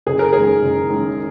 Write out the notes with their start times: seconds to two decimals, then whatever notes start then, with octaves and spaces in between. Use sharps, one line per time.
0.06 F#1 G#4
0.19 A#4
0.33 F#2 D#3 G#3 G#4
0.62 F#1
0.89 F#2 D#3 G#3